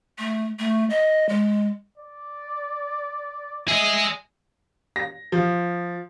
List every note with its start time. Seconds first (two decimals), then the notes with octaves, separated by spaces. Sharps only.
0.18 A3
0.59 A3
0.90 D#5
1.29 G#3
1.98 D5
3.68 G#4 D#5 E5
4.96 A#6
5.32 F3